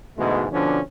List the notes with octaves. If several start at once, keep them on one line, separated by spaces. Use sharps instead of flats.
D2 G#2 B2 E3 G#3 A3
B2 D3 F3 C#4 D4